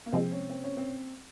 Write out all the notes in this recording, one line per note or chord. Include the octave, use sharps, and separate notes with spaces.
A#3
C3 F3 G#3 C4
C#4
C4
C#4
C4